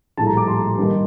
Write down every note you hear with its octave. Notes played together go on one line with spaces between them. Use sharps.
A#1 A2 G3 A5
A#5
D6
C6
G2 D#3 G3 A#3 D#4